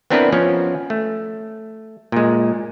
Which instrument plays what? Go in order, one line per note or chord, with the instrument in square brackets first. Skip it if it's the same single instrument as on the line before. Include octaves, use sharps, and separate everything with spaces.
[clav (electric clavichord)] B3 C4 D4 E4 A#4 B4
F3 B3 C#4
A3
A#2 G#3